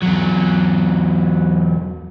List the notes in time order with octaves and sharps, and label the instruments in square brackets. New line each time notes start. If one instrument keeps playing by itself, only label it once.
[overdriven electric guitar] E2 F#3